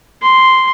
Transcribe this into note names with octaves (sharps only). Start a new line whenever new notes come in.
C6